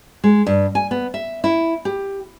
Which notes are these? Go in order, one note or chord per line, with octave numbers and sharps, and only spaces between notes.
G#3
G2
G#5
B3
E5
E4
G4